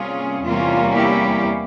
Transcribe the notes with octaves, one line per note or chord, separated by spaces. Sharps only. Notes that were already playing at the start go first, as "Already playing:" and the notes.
Already playing: C3 G3 A#3 C#4 F4 G#4
E2 C3 G3 A#3 C#4 F4
E4 G4